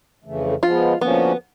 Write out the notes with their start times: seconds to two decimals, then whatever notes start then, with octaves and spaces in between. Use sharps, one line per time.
0.24 F2 C#3 E3 A3
0.63 F3 G#3 B3 F4
1.01 D3 F3 A#3 B3 C#4 F#4